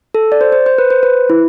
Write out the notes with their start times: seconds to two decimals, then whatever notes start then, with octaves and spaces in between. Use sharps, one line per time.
0.14 A4
0.32 D5
0.41 C5
0.52 C5
0.66 C5
0.78 B4
0.90 C5
1.03 B4
1.30 E4